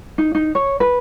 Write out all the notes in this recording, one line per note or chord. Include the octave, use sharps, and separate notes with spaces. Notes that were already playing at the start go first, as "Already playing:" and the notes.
D#4
D#4
C#5
B4